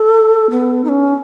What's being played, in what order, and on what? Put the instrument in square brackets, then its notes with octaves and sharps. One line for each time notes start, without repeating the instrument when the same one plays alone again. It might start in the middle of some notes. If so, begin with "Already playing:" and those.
Already playing: [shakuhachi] A4
B3
D#4
C#4